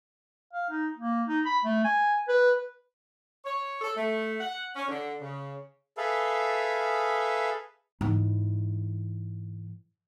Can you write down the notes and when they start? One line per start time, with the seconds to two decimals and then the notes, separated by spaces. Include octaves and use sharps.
0.53 F5
0.70 D#4
0.97 A#3
1.28 D#4
1.45 B5
1.65 A3
1.84 G#5
2.28 B4
3.45 C#5
3.81 A4
3.96 A3
4.40 F#5
4.75 C#4
4.88 D3
5.21 C#3
5.97 G#4 A4 B4 E5 F5
8.01 G#2 E3